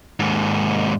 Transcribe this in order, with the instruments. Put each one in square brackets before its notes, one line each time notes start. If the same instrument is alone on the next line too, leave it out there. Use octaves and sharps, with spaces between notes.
[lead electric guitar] D#2 G#2